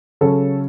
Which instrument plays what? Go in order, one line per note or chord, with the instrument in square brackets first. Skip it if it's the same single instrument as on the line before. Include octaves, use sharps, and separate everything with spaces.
[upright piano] C#3 F#3 C#4 A4